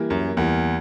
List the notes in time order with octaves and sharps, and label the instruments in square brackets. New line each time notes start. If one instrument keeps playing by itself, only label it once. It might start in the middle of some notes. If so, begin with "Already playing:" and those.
Already playing: [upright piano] E3 G3 A#3
[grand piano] F#2
[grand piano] E2 [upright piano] E3 G3 A#3